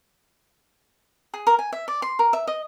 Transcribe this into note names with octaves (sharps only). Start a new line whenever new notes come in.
G#4
A#4
G#5
E5
D5
C6
A#4
E5
D#5